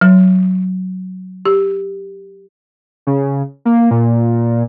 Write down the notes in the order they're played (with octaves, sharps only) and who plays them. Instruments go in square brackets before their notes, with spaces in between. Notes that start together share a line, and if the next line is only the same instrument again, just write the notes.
[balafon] F#3
G4
[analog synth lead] C#3
A#3
A#2